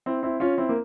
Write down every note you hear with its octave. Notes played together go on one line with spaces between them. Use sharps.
C4 E4
C4 E4
C#4 F4
C4 E4
A#3